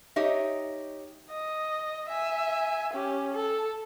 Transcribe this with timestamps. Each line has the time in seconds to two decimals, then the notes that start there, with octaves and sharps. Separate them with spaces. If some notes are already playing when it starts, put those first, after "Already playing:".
0.16 D#4 G4 C#5 D#5 E5
1.31 D#5
2.08 E5 G#5
2.93 C#4 G4
3.33 A4